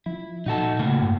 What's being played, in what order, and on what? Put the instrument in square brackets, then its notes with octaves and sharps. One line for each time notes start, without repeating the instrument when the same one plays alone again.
[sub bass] F3 [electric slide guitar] E4
[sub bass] A#2 [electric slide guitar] D#4 F#4 A4
[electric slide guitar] A2 A#3 F#4 [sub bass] C#3
[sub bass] G2